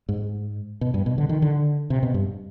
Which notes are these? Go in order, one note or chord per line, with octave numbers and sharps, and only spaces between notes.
G#2
B2
G2
B2
D3
D#3
D3
C3
B2
G2